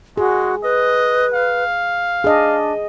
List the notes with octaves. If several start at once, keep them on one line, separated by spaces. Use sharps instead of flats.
G#3 F#4 G#4
B4 D#5
F5
D4 G#4 D#5